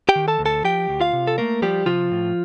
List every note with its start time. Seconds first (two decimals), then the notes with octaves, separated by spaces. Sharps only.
0.09 G4 G5
0.16 D#3
0.28 A4 A5
0.39 D2
0.45 A4 A5
0.64 F3 G4 G5
0.89 D2
1.01 F4 F5
1.13 C3
1.27 A4
1.38 A3 A#3 A#4
1.62 F3 G3 G4
1.86 C3 F3 F4
2.12 A2